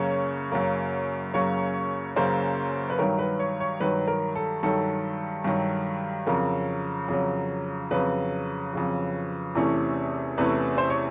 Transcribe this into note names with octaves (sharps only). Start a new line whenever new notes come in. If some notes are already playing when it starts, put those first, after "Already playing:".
Already playing: F#2 C#3 F#3 A#3 C#5
F#2 C#3 F#3 A#3
F#2 C#3 F#3 A#3 C#5
F#2 C#3 F#3 A#3 C5
B4
G2 D#3 F#3 A#4
B4
C#5
C#5
G2 D#3 F#3 B4
A#4
A4
G2 D#3 F#3 A4
G2 D#3 F#3
F2 C#3 F#3 A#4
F2 C#3 F#3
F2 C#3 F#3 B4
F2 C#3 F#3
E2 C3 E3 A3 C#4
E2 C3 E3 A3 C#4 B4
C5
C#5